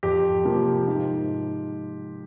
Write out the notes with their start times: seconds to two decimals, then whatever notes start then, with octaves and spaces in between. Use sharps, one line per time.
0.03 F2 G4
0.45 C3 F3 A#3
0.88 G#2